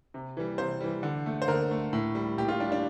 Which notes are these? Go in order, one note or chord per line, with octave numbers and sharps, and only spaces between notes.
C3
E3 G3
C3 C5
E3 G3
D3
A3
C5
D3 A#4
A3
A2
G3
A2 G4
F4
G3 D4
D4